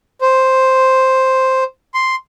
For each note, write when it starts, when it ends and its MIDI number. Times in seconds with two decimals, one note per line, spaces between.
0.21 1.64 72
1.94 2.15 84